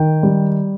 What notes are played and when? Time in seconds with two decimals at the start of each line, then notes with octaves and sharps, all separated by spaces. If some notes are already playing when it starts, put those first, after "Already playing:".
Already playing: D#3 G5
0.23 G3